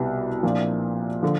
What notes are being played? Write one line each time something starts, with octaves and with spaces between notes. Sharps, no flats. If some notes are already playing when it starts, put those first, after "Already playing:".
Already playing: C2 B2 G3 B3
A#2 F3 A#3 D4
D3 F3